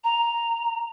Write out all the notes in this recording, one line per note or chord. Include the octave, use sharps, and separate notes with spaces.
A#5